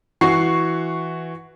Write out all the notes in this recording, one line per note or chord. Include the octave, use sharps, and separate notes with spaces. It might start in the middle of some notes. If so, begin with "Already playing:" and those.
E3 F#4 C#6 C7